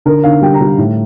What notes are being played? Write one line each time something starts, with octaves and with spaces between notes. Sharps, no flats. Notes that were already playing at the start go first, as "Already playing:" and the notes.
D3 A#4
D3 F5
G3 G5
A#5
G3
A2